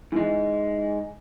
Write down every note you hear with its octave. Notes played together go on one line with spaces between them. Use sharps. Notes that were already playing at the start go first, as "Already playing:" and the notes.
G#2 E3 G#3